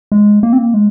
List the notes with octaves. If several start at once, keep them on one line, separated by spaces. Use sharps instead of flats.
G#3
A#3
C4
A#3
G#3